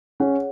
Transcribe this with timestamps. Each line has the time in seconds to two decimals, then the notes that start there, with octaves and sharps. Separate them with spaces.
0.20 C#4 G#4 C#5 F#5